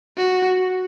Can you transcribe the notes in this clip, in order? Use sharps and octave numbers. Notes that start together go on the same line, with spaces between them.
F#4